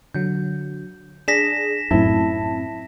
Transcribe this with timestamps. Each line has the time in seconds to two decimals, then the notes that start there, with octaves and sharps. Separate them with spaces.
0.14 D3 F#3 G6
1.28 D4 G#4 A#6 B6 E7
1.91 F#2 A2 C4 E4 A5